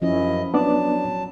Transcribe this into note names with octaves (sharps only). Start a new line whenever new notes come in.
F#2 F3 C#4 E4 D#5
F#3 B3 D4 D5 A5